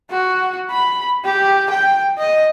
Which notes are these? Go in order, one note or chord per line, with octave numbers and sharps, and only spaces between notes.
F#4
B5
G4
G5
D#5